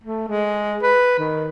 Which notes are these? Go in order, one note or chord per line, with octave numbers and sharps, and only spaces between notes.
A3
G#3
B4
D#3